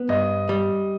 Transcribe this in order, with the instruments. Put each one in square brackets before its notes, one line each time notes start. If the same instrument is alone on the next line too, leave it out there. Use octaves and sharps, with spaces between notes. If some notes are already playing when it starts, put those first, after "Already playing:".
Already playing: [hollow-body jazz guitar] B3
[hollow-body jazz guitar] G2 [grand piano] D#5
[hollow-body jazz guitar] G3